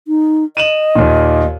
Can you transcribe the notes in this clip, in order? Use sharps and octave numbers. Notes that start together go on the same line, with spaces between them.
D#4
D#5 D#7 E7 F#7
D#2 A#2